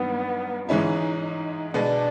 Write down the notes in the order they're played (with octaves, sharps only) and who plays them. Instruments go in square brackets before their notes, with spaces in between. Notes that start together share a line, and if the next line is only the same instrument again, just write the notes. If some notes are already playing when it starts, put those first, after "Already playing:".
Already playing: [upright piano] G2 D#3 F#3 A#3 [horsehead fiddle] B3
[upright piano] G#2 E3 G#3 C#4 E4 [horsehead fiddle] D#4
[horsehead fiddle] D#4
[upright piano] B2 G#3 B3 [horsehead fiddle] D4